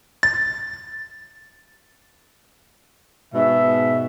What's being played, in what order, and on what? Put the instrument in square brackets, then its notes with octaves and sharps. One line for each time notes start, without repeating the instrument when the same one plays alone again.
[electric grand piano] A6
[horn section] G#2 B2 E5